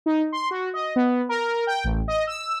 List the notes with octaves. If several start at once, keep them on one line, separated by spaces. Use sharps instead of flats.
D#4
C6
F#4
D#5
B3
A#4
G5
A1
D#5
E6